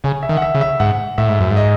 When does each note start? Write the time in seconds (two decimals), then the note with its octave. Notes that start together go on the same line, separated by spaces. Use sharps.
0.04 C#3 G#5
0.23 E5
0.29 D#3
0.37 F#5
0.42 E5
0.55 C#3
0.61 E5
0.80 G#2 F#5
1.18 A2 E5
1.29 G#2
1.40 F#2
1.50 G#2
1.57 D#5